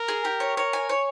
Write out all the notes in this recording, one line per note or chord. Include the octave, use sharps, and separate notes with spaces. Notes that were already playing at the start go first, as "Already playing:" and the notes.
Already playing: A#4
G#4
G4
C#5
A#4 C#5
G#5
C#5